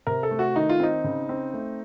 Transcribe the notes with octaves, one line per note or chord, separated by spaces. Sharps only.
C3 A#4
A4
A3
F#4
D#3 D#4
F4
C4 D#4
C#3
C4
A3